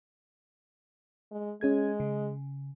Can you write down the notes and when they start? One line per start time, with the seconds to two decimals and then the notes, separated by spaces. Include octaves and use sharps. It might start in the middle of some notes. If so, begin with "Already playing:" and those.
1.31 G#3
1.61 G#3 C#4 G#4 G#6
2.00 C#3